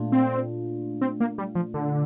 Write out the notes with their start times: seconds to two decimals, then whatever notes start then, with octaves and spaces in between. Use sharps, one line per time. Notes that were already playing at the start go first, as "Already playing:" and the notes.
Already playing: A#2 A3 D4 F4
0.12 C4
1.01 C4
1.20 A#3
1.38 G3
1.55 F3
1.74 D3